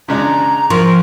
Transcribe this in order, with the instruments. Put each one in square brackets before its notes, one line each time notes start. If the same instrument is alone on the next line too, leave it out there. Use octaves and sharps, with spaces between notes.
[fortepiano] C#3 G#3 D4 [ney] A#5
[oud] F3 [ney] A#4 [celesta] C6 [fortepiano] C#6